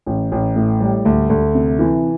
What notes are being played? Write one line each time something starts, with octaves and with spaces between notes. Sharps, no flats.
A1
A1
A2
G3
D2
D2
C3
E3